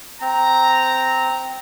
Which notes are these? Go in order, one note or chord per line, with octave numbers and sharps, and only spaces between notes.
C4 A#5